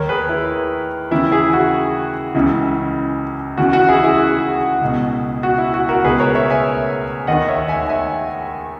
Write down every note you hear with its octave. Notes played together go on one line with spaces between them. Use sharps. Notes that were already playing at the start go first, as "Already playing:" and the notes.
Already playing: D#2 D#3 A#4 C#5
G#4 B4
E4
D#2 C#3 E3 E4
E4 G#4
F#4
C#2 C#3 E3 E4
D#2 C#3 E3 F#4
F#4
E4 G#4
E4 G#4
C#2 B2
F#4
E4
F#4
F#4 A#4
C#2 B2 G#4 B4
A#4 C#5
C#5 E5
E5 G#5
D#2 D#3 D#5 F#5
C#5 E5
E5 G#5
E5 G#5